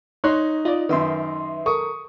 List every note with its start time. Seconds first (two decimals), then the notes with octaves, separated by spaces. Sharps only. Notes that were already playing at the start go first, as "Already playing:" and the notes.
0.24 D#4 C#5 C6 F#6
0.65 F4 D5 D#5
0.89 F#2 D#3 B4 E5 C6
1.66 A4 A#4 C#6 D#6